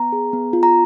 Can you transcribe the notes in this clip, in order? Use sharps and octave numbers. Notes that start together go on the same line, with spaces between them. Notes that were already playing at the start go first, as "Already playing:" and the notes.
Already playing: B3 A#5
G#4
B3
F4
A#5